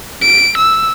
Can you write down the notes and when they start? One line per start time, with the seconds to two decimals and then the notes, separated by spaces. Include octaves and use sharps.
0.22 D7
0.58 E6